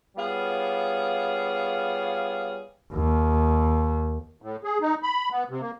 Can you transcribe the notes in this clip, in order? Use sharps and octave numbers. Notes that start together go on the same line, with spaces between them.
G3 B3 F4 G#4 C#5 F5
D#2
A2
G#4
D#4
B5
B3
C3
A#3